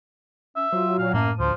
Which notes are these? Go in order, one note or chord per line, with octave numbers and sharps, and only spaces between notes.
C#4 E5
F#3 F4 C5
A#2 F5
F#2 A2 A#3 A5 D#7
D2 F3 C5